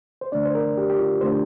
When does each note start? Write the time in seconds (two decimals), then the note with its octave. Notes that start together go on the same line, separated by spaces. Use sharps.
0.21 C5
0.32 D3 A3 D4 D5
0.45 C5
0.55 A#4
0.78 G4
0.89 G4
0.99 F4
1.21 D3 A3 D4 C5